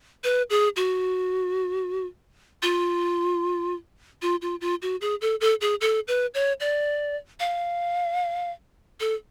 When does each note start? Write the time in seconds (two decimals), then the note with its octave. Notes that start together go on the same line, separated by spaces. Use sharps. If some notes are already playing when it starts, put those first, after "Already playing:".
0.24 B4
0.50 G#4
0.76 F#4
2.63 F4
4.22 F4
4.42 F4
4.61 F4
4.82 F#4
5.01 G#4
5.21 A4
5.41 A4
5.61 G#4
5.81 A4
6.08 B4
6.34 C#5
6.60 D5
7.40 F5
9.00 A4